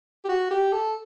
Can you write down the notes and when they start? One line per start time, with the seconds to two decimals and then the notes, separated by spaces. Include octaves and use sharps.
0.25 G4
0.29 F#4
0.51 G4
0.73 A4